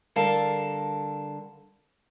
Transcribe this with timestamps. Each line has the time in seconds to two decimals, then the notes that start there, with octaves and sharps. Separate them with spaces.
0.16 D3 G3 A4 A#4 F5 A5